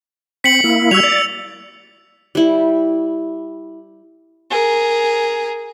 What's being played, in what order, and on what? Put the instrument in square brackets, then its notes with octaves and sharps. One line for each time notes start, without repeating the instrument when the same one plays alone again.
[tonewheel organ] C4 [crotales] B6 C#7 F#7
[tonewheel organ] A#3 E4
[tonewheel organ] G3 F#4 G#6 [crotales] E6 F7
[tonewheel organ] D5 A6
[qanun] G3 E4
[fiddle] G#4 A#4